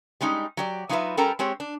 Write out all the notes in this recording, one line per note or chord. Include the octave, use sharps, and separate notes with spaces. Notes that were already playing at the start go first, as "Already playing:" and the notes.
G3 G#3 C#4 D#4
F#3 G4 D5
F#3 D#4 F4 F#4 B4 E5
G3 C#4 A4 A#4 G5 A#5
G#3 C4 G4 C#5
D4